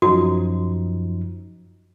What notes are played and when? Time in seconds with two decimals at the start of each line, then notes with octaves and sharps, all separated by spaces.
0.02 F#2 F3 D#4 F#4